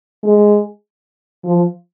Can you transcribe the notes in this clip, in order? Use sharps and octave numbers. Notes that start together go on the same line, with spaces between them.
G#3
F3